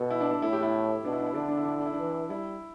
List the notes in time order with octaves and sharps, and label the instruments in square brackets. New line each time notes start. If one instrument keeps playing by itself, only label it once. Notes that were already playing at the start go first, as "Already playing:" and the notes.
Already playing: [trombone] B2 [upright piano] A4
[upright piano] E4
D4
D4
[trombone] A2 [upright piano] E4
[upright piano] G4
E4
[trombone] B2 [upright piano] D4
[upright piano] E4
D4
E4
[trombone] D3 [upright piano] D4
[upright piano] E4
D4
E4
D4
E4
D4
E4
[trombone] E3 [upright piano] D4
[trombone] G3 [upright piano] E4